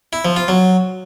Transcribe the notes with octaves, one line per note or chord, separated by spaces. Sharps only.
E4
F3
F4
F#3